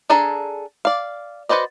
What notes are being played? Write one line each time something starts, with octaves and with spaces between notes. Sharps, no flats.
D4 G#4 A4 G#5 A#5
D5 F5
F#4 B4 C5 D5 D#5